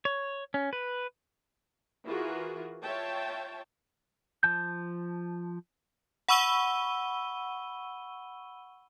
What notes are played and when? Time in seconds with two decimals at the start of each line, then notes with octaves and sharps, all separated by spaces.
0.05 C#5
0.54 C#4
0.73 B4
2.05 E3 F4 F#4 G#4 A#4
2.83 F4 C#5 E5 G5 A5
4.43 F3 A5 G6
6.29 F#5 B5 C#6 E6 D#7 G7